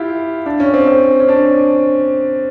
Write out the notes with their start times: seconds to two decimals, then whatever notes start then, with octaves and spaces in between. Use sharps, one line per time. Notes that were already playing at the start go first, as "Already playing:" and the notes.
Already playing: E4 F4 G4
0.46 D4
0.60 C#4
0.74 C4
0.87 C4
1.20 C#4
1.28 D4